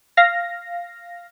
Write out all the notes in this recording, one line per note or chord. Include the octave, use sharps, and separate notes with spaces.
F5 A#6